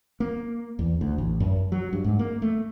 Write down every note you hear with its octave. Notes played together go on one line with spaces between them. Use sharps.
A#3
E2
D2
A1
F#2
F#3
G2
G#2
A#3
A3